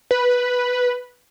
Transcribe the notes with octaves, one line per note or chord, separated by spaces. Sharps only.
B4